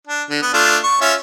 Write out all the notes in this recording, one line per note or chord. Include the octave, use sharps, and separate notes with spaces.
D4
D3
B3
A3 D4 F4
C#6
C#4 F4 E5